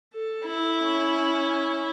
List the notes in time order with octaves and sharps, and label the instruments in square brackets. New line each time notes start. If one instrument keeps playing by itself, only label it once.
[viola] A4
[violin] E4
[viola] C#4